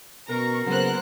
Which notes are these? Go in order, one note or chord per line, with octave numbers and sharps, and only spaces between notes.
F#2 B2 A#4 A#5 C#6
C#3 F#3 A#3 B3 C5 F#6